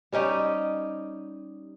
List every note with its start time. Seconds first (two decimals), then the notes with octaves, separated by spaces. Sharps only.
0.12 G3 C#4 D#4 G4